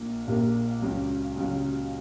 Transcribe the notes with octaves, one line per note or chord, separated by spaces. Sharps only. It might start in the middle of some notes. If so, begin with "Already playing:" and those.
Already playing: A#1 A#2 A#3
A#1 A#2 A#3
C#2 C#3 F#3
C#2 C#3 F#3